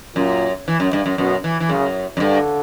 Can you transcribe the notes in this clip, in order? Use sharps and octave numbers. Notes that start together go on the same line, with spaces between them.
F#2 A#2
E3
F#2
G2
F#2
F#2 B2
E3
E3
F#2 C#3
F#2
G2 D3